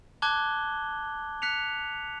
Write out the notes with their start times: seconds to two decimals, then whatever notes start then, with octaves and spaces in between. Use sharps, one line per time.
0.22 A5 D6 F#6 G#6 G7
1.42 F#6 B6 C#7 F7